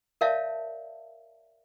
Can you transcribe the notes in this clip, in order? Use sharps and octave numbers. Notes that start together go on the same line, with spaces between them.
A#4 C#5 D5 E5 F5 A5